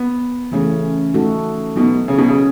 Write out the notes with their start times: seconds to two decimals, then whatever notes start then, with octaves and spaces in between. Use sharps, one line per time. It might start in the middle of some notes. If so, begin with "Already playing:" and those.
Already playing: B3
0.52 C#3 E3 A3 C#4
1.14 A3 D#4 F#4 A4
1.76 B2 F#3 B3 D#4
2.08 C#3
2.18 B2
2.29 C#3